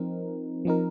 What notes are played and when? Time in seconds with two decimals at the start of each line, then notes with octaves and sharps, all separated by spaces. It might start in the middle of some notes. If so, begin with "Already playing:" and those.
Already playing: F3 C4 D#4 A#4
0.65 F3 C4 D#4 A#4